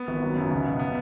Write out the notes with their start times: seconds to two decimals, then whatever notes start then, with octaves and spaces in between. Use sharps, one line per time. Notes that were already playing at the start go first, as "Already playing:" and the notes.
Already playing: B3
0.08 G#1
0.22 F#3
0.37 F#2
0.50 C#2
0.66 B2
0.79 B3